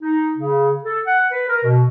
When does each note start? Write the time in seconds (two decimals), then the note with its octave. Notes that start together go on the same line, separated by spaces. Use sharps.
0.02 D#4
0.37 C#3
0.83 A4
1.06 F#5
1.31 B4
1.48 A#4
1.64 B2